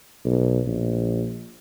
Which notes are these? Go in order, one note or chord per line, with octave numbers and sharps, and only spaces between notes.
B1
A#1